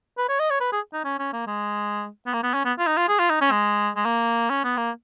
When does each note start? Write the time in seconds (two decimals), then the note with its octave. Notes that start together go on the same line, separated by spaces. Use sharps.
0.17 B4
0.29 C#5
0.39 D#5
0.50 C#5
0.60 B4
0.72 G#4
0.93 D#4
1.04 C#4
1.19 C#4
1.33 A#3
1.47 G#3
2.26 B3
2.33 A#3
2.43 B3
2.54 C#4
2.65 B3
2.79 F4
2.87 D#4
2.97 F4
3.08 G#4
3.19 F4
3.30 D#4
3.41 C#4
3.51 G#3
3.96 G#3
4.05 A#3
4.50 C#4
4.64 B3
4.77 A#3